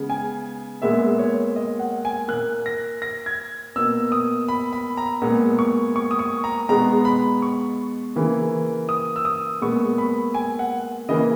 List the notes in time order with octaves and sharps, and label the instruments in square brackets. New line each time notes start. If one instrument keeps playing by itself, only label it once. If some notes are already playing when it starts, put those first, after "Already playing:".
Already playing: [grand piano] C#3 G#3 B3
G#5
A#2 G#3 B3 E5
C#5
D#5
F#5
G#5
A#2 A#3 F#6
A#6
A#6
G#6
B2 A#3 E6
D#6
B5
B5
A#5
A#2 G#3 B3
C#6
C#6
D#6
C#6
A#5
B2 G#3 B3 A#5
B5
C#6
C#3 E3 A#3
D#6
E6
D#6
A#2 G#3 B3 C#6
B5
G#5
F#5
C#3 E3 A#3 D#5